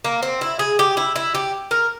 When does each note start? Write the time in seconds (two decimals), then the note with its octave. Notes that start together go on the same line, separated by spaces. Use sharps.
0.04 A#3
0.23 C4
0.41 E4
0.59 G#4
0.79 G4
0.97 E4
1.16 E4
1.35 G4
1.71 A#4